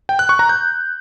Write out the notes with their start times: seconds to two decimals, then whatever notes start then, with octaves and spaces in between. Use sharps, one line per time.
0.09 G5
0.19 F#6
0.29 C#6
0.39 A#5
0.49 G6